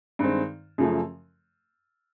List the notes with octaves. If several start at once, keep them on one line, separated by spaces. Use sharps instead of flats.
G2 D#3 G#3 C4
F#2 C#3 F3 A3